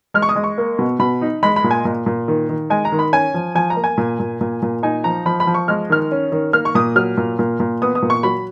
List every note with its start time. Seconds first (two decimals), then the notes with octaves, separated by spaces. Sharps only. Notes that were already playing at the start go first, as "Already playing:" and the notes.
0.14 G#3 F6
0.22 C#6
0.29 D#6
0.36 G#3
0.44 C#6
0.58 A#3
0.79 B2
0.99 B2 B5
1.22 D#4
1.43 G#3 B5
1.56 B5
1.64 A#2
1.71 G#5
1.85 A#2
2.06 A#2
2.28 D#3
2.49 D#3
2.70 G#3 G#5
2.85 A#5
2.92 D#3
2.99 B5
3.13 C#4 G#5
3.34 F3
3.55 F3 G#5
3.70 A#5
3.76 A#3
3.84 G#5
3.98 A#2
4.20 A#2
4.41 A#2
4.62 A#2
4.83 D#4 G#5
5.04 F3 A#5
5.26 F3 B5
5.40 B5
5.47 F3
5.54 C#6
5.68 G#3 F6
5.90 D#3 F6
6.12 C#4
6.32 D#3
6.53 A#3 F6
6.65 C#6
6.75 A#2 D#6
6.96 F#3 F6
7.17 A#2
7.39 A#2
7.60 A#2
7.82 B3 D#6
7.95 D#6
8.02 A#2
8.10 C#6
8.23 F#3 B5